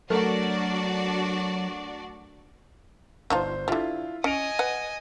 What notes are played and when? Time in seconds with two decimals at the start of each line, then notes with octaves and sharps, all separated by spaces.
0.10 F#3 A3 D4 F#4 A#4 D5
3.30 G1 F3 D#4 F4 C5
3.68 D3 G3 E4 F4
4.24 C#4 D#5 G#5 C#7 D7 F7
4.59 B4 F#5